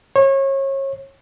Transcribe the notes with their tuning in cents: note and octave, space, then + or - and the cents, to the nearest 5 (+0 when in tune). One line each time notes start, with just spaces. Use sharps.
C#5 -30